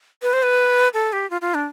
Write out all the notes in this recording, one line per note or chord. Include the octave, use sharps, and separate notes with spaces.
B4
C5
B4
A4
G4
F4
F4
D4